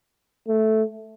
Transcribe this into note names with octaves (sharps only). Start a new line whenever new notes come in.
A3